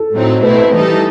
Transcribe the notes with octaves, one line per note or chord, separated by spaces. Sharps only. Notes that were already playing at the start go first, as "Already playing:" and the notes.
Already playing: A4
A2 F#3 C4 D#4
B2 A3 C4 E4 B4
E3 G3 D#4 A4